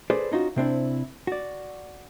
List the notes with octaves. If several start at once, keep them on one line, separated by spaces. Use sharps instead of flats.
G#4 A4 B4 C5 D5
C#4 D#4 F4 F#4
C3 C4 D4 E4
F#4 D5